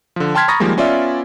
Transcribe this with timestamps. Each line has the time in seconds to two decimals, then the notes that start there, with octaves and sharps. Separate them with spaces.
0.16 D3 F3
0.35 G5 A5 C6 F6 G#6 B6
0.48 A#5 B5 C#6 D#6 A6 A#6
0.60 D#3 F3 G3 G#3 A#3
0.77 B3 C#4 F4 D5 E5